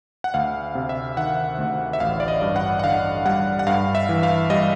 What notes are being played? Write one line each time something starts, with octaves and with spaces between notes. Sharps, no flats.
F#5
D2 F5
C3
E5
D#3 F#5
D2
E5
A1 F5
D5
D#5
G2
F#5
F#5
D3 F5
G3 F#5
F#5
G2 F5
E5
E3
F5
G3 D#5